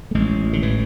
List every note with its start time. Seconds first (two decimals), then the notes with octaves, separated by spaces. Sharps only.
0.11 A3
0.15 A1 G#3
0.53 D3
0.62 A2 E3